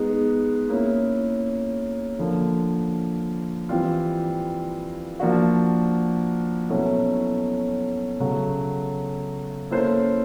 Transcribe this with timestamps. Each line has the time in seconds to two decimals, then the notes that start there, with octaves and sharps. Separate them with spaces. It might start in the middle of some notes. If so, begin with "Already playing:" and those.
Already playing: G#3 B3 D#4
0.69 A#3 C#4 E4
2.19 D3 F3 A#3
3.69 E3 G3 C4 F4
5.20 F3 A#3 D4 F#4
6.70 B2 F#3 A3 C#4 E4
8.20 C#3 F#3 A3
9.70 A#3 C#4 E4 A4 C5